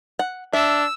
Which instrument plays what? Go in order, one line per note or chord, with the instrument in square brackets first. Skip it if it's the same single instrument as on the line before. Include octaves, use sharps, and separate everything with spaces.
[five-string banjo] F#5
[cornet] D4 [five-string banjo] E5 [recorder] E6